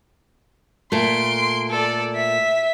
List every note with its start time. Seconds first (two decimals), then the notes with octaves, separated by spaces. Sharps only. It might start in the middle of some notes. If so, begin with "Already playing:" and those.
0.92 A#2 A3 C6 D7
1.69 A4 D5
2.16 E5 B6